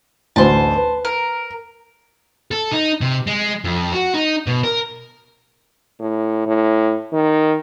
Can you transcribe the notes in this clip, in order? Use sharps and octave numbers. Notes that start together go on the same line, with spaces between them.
A1 D2 C5 A5
B4
A#4
A4
D#4
C3
G#3
F2
F#4
D#4
B2
A#4
A2
A2
D#3